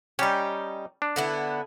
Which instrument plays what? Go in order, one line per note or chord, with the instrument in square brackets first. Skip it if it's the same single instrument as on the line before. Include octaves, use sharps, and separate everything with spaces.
[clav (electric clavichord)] G3 C#4 [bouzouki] D#4 G4
[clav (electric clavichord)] D4
[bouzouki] D3 B3 E4